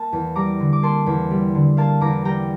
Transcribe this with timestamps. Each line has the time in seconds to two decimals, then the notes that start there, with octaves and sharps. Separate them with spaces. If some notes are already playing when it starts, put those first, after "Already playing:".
Already playing: A#3 A5
0.12 E2
0.36 G3 A#5 D6
0.60 D3
0.73 D6
0.82 A#3 A5 C6
1.06 E2
1.31 G3
1.55 D3
1.77 A#3 F5 A5
2.01 E2 A#5 D6
2.25 G3 G5 A#5